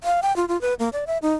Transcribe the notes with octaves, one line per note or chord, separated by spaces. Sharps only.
F5
G5
F4
F4
B4
A#3
D5
E5
D#4